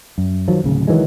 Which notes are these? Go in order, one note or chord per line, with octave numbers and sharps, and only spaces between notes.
F#2
D#3 F3 F#3
D1 C#3
D#3 E3 F#3 G#3